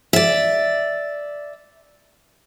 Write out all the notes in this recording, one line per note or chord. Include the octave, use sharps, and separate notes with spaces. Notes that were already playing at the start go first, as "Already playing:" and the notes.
D5 E5